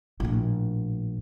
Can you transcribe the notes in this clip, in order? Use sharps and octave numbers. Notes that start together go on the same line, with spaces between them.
A#1 A2